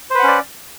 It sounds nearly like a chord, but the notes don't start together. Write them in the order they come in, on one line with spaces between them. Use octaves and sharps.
C5 B4 F#5 C#4 D5